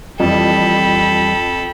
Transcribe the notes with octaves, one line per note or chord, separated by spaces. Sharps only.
F2 E3 G3 A4 G5 B5